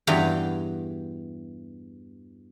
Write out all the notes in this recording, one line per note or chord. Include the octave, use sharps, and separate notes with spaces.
E2 G2 E3 F#4 F5 G5